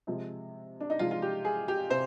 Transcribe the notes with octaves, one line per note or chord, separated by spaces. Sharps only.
C3 F3 G#3
D4
D#4
C3 F3 G#3 F4
F4
G4
G#4
G4
C3 C5